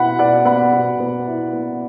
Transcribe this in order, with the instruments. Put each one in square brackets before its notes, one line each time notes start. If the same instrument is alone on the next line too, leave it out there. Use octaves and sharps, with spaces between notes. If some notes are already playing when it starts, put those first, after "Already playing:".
Already playing: [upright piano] B2 E4 F#5 B5
B2 D5 F#5
B3 F#5 B5
B2
B3
E4
B3